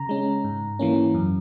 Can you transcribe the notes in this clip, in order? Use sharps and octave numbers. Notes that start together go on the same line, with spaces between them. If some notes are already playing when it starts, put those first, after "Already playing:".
Already playing: C#3 A#5
G#3 C#4
G#2
E3 A#3 C#4
F#2